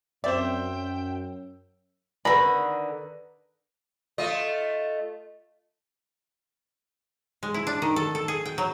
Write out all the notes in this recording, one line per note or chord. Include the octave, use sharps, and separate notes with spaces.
F#2 C4 C5 D5 E5 G5
D3 D#3 B4 B5 A#6
A3 F4 D#5
G#3
E4
D4
D#3
A4
A4
G#4
G5
F#3